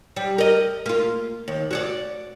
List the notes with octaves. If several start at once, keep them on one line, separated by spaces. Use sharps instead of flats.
G3
A#4 D#5
A#3 F4
D#2
F#4 C#5 D5